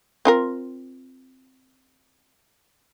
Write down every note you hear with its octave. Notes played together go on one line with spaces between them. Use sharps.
C4 F4 A#4